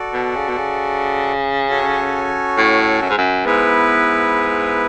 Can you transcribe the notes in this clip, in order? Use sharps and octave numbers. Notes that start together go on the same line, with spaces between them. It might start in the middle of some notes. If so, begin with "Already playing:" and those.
Already playing: F#4 A4 D5
B2
C#3
B2
C#3
C#4 F#4 A4 C#5 G#5
A2
F#2
G#2
F#2
G#2 B3 E4 B4